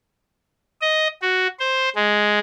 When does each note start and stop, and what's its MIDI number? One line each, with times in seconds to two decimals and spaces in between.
0.81 1.07 75
1.22 1.48 66
1.59 1.89 72
1.96 2.39 56